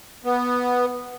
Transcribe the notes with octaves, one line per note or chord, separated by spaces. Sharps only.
B3